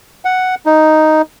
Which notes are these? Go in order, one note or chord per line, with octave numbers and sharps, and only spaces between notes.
F#5
D#4